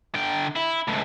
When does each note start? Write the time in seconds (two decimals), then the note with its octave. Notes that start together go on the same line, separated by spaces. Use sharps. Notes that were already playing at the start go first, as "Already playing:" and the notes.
0.15 D3 G5
0.56 E4
0.88 C#2 A2